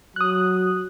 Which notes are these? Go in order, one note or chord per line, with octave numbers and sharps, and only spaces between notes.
F#3 D#6 F#6